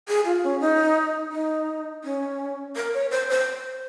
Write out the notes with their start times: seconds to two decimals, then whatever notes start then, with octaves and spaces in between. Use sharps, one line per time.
0.08 G#4
0.25 F4
0.44 C#4
0.61 D#4
1.32 D#4
2.04 C#4
2.76 A#4
2.94 C#5
3.11 C5
3.30 C5